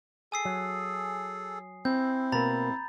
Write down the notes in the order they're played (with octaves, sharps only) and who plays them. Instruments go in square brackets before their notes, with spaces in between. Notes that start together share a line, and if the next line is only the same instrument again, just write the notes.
[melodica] G#4 A4 [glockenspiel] G#5 D#6 C7
[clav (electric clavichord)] F#3
[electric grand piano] C4 [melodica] E4 [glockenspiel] G6
[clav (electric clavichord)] B2 A#3 [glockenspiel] A#5 B5 A6